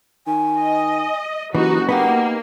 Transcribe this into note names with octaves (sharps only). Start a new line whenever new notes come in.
D#3 G#5
D#5
F#1 E3 D#4 F#4 G4
A#3 B3 D#4 G4 F#5